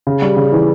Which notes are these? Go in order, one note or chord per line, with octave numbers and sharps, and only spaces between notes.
C#3
G3
C#3
E3